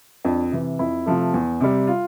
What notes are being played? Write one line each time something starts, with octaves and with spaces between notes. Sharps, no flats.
F2 D4
C3 E3
F2 E4
C3 F3 A3
E2
C3 G3
F4